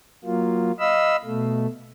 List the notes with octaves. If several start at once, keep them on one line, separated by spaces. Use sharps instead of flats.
F#3 A#3 F4
D#5 F5 B5 E6
B2 A3